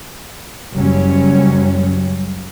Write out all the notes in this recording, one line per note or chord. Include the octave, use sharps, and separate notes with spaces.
F#1 F#3 G3 C#4